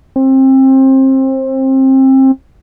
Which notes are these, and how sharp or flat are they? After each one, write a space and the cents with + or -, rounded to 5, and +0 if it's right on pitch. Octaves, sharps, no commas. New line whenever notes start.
C4 +25